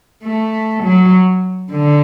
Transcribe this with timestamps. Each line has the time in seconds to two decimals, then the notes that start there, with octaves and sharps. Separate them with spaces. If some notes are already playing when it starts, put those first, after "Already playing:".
0.24 A3
0.83 F#3
1.72 D3